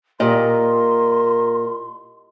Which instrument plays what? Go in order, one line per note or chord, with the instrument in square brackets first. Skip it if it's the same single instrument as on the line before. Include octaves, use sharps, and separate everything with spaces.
[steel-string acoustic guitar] A#2 [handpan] G4 D#5 [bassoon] A#4 [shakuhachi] C6